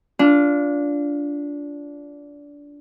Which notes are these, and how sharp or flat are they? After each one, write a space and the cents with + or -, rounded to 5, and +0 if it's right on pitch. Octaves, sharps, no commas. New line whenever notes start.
D4 -20 F4 +0